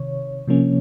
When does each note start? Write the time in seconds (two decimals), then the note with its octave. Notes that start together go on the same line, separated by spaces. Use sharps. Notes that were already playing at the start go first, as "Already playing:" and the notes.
Already playing: C3 D#3 C#5
0.48 C3 F3 A#3 C#4